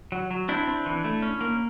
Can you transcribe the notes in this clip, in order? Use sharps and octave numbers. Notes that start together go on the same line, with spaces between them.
F#3
F#3
C4 D4 E4
C4
E3
A3
C#4
A#3